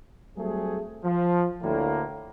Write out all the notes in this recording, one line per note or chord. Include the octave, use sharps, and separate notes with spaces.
F#3 G3 A3 C4 G#4
F3
D2 A2 D3 A#3